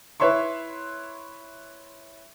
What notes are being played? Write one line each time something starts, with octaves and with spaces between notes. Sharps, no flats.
E4 B4 C#5 E5 C6 C#6